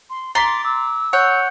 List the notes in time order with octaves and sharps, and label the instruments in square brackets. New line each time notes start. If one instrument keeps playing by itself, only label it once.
[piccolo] C6
[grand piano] A#5 B6 [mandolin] C6 [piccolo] D6 [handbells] A6
[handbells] D6 [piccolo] E6
[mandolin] C#5 [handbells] F#5 F#6 G6